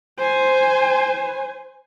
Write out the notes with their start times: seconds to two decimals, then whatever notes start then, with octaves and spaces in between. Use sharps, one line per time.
0.18 C5 G#5